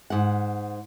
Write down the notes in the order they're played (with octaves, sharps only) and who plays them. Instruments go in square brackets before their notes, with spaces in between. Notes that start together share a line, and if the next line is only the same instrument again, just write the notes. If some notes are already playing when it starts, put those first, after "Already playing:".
[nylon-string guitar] G#2 F#5